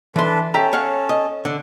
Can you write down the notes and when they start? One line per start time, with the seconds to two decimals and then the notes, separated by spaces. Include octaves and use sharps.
0.16 E3 D4 A4 B4 C6
0.54 C#4 G4 A4 E5 A#5
0.73 C#5 F5 F#5
1.09 D#5
1.45 D3